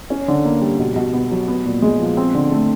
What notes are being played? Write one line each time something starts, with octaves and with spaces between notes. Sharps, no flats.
C#4
D3
A#3
G3
B2
B2
B3
F#3
B3
A#2
G#3
F3
C4
D3
A3